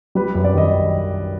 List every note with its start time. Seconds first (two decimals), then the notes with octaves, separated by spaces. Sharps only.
0.15 G3 B4
0.35 F#2
0.45 D5
0.54 D#3 D#5